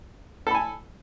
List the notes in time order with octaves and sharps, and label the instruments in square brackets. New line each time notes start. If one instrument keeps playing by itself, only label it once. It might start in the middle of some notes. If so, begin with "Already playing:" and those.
[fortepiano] A4
B5
G#5